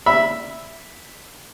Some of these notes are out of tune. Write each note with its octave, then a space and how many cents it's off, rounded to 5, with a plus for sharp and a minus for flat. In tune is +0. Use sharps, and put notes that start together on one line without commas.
E5 +0 B5 +0